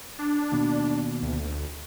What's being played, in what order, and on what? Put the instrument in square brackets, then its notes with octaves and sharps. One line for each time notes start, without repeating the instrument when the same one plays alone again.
[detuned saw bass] D4
[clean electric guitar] D#2 B2
[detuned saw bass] D2